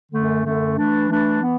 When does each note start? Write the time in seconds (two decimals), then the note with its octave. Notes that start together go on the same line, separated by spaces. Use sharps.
0.12 F#2 D3 A3
0.44 F#2 D3 A3
0.77 E3 A3 D4
1.08 E3 A3 D4
1.41 E3 B3